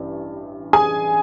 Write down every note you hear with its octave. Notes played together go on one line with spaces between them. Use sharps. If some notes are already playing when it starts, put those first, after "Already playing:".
Already playing: A1 G2 E3
G#4 G#5